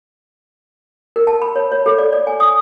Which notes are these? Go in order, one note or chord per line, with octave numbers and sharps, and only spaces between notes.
A#4
A5
B5
C#5
C#5
A4
D5
D5
G#5
D#6